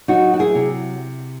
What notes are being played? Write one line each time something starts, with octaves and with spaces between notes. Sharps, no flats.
F#3 D#4 F#4
F#4
E4 G#4
C3